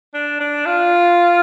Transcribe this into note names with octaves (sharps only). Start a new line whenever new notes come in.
D4
D4
F4